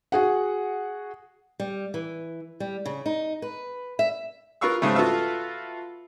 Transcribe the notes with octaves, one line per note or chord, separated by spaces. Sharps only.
F#4 G#4 F#5
G3
E3
G3
C#3
D#4
B4
E5
F4 A#4 B4 F5 C#6 E6
G#2 C#3 G3 A3
F4 F#4 A4 B4 E5 F5